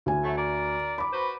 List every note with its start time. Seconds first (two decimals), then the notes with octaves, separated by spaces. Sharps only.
0.06 D2 G#5
0.23 F#3 A3
0.37 A#4 D5
0.98 B5 D6
1.12 F#4 B4 C5